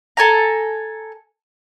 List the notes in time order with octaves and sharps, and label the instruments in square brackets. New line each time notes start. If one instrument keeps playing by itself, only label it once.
[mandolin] A4 G#5 A#5